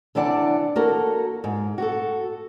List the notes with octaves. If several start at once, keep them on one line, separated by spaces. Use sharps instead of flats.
C3 E3 D4 D5 F#5
A#3 F#4 A4 A#4
G#2
F#4 G4 A4